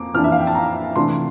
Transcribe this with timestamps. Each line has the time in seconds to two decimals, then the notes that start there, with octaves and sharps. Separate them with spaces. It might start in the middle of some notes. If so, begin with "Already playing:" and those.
Already playing: F2 A#3 D6
0.14 F2 E3 A#3 D4 F6
0.24 E5
0.32 F5
0.39 G5
0.47 A5
0.55 A#5
0.96 C3 E3 A3 D4 C6